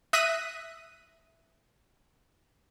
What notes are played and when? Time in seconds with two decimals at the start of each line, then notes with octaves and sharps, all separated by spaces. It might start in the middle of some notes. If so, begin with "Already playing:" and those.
0.13 E5 D#6 F#6 A#6 B6 D#7